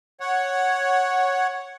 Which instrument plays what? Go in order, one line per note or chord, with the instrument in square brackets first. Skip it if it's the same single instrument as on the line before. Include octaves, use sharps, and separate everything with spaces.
[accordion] C#5 F#5